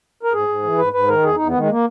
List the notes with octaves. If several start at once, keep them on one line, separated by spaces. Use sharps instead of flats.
A#4
G#2 G#4
G#2
E3
G#2 B4
G#2 B4
D#3 A#4
E2 G#4
E2 D#4
B3
D#3 G#3
A#3